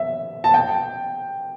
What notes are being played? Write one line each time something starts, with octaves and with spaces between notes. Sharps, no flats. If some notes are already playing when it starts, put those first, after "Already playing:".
Already playing: E5
A5
G5